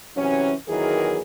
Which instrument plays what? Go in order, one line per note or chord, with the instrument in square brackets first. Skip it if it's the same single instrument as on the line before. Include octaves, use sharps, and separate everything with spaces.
[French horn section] C3 E3 F#3 C#4
E2 D#3 E3 F#3 G#4 A#4